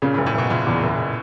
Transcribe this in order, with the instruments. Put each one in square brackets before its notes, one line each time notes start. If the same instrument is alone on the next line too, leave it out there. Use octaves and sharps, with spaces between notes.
[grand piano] A#2 [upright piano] C#3
[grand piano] A2
[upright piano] F#1
[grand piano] A2
[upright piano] F#1 [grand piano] B2
[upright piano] F#1 [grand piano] A#2
[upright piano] E2
F#1